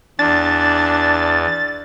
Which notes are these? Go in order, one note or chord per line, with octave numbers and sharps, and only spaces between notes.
E2 D4 A6